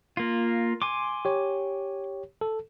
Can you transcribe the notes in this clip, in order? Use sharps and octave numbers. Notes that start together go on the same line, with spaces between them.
A#3 F4
G#5 C6 D6
G4 C#5
A4